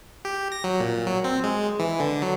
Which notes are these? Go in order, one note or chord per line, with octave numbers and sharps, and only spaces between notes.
G4
A#6
F#3
A#2
F#3
C4
G#3
E3
D3
F#3